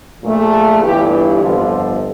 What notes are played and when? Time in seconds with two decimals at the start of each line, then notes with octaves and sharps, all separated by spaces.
0.22 A#1 A#2 A3
0.82 G1 G2 E3 G4
1.42 G1 F2 D3 F3 F4